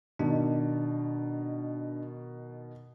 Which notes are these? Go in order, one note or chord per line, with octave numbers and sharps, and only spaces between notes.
B2 D#3 D4